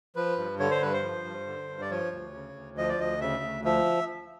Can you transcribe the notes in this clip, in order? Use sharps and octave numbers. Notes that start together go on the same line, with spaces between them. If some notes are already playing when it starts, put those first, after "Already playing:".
F3 B4
G2
D3 C#5
C5
G2 B4
C5
F3
G2
D3
G2
D5
F3 C#5
D2
C#3
D2
F3 D#5
D5
D2 D#5
C#3 E5
D2
F3 E5